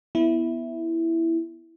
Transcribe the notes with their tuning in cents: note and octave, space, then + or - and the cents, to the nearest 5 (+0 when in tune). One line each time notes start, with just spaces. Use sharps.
B3 +0 E4 +0